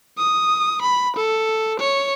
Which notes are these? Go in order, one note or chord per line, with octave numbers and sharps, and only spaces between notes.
D#6
B5
A4
C#5